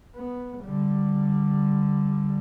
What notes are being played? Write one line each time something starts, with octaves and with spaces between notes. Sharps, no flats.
B3
D3 G3